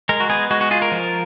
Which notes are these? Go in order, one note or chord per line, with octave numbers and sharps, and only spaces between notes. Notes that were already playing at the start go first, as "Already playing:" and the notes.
G#3 A#4
F#4
B3 G#4
G#3 F#4
F#4
F4 G#4
A#4
F3